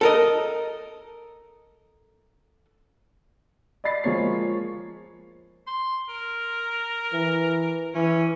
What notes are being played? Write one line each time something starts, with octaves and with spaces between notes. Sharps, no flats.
A4 A#4 D#5
D5 D#5 B5 A6 C7
F3 G#3 A#3 C#5 C7
C6
A#4
E3
E3 C#4